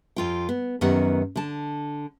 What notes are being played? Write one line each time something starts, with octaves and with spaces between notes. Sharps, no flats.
F2 F4 G5
B3
F#2 D#3 B3 G4 F#5
D3 A5